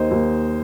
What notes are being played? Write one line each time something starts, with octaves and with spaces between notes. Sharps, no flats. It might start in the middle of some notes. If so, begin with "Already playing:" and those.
Already playing: D#2 C5 D#5
D#2